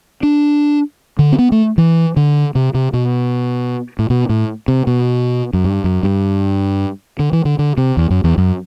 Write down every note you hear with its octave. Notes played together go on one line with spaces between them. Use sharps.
D4
D3
C4
B3
A3
E3
D3
C3
C3
B2
A2
B2
A2
C3
B2
F#2
G2
F#2
G2
D3
E3
D3
D3
C3
E2
F#2
E2
F#2